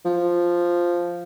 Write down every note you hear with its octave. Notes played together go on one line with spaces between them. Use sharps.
F3